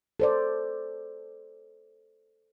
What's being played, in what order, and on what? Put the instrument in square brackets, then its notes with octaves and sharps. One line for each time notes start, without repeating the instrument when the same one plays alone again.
[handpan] A4 C5 D5